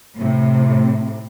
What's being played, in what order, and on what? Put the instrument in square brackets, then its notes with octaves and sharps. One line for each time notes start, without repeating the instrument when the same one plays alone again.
[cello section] A2 C3